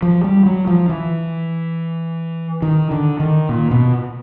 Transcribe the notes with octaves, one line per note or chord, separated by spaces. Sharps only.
F3
G3
F#3
F3
E3
D#3
D3
D#3
A#2
B2